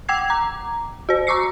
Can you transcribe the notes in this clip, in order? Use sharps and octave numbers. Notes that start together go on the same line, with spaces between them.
F#5 G5 D6 E6 G#6 C7
A#5 D6
F#4 C5
A#5 C#6 D6 E6 C7 C#7